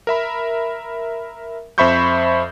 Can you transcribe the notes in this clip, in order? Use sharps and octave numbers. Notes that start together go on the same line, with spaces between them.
A#4 E5 B5
F2 C5 E5 B5 C#6 G6